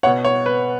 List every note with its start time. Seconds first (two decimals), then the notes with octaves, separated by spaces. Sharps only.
0.03 B2 B3 C#5 F#5
0.25 C#5
0.46 B4